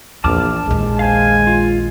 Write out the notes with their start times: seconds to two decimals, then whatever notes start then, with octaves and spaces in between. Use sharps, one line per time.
0.24 A#1 E2 A5 D6 F6
0.66 A#1 D#2 G#3
0.99 C5 F5 G#5
1.47 F4